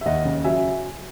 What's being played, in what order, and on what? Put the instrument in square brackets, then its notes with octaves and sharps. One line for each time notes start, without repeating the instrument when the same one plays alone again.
[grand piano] E5
D#2 D#5 F#5
C#3
F#3 E5 G#5